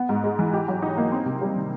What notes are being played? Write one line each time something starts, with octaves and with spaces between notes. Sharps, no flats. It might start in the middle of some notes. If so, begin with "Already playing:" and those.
Already playing: B3
G#2
G#3
E3
G4
F#3
D#4
A#3
C4
C3
G3
D#3